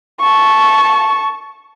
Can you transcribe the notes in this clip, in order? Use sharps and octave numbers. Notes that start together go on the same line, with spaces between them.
A5 C#6